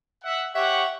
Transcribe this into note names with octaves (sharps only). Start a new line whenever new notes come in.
E5 F#5
G4 C#5 E5 F#5